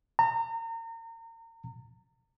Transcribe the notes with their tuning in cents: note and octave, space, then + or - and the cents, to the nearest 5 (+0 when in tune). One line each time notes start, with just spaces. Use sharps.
A#5 -35